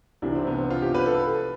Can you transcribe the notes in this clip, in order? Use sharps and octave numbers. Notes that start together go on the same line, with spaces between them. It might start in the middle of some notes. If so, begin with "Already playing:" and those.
C2 C3 E3 D4
C4
B3
C4
F4
G4
B4
A4